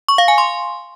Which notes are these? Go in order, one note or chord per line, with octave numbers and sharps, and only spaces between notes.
C#6
F5
G#5
C6